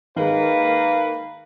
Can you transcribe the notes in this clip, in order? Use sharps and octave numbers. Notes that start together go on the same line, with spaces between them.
D#3 G#3 A#3 B4